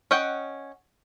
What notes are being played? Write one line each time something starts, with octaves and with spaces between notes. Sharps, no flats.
C#4 D#5 F#5 G5